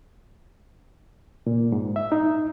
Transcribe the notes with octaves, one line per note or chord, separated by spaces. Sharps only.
A#2
G#2
E5
D#4